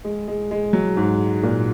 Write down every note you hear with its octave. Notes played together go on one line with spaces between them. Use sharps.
G#3
G#3
G#3
F#3
G#2
A#2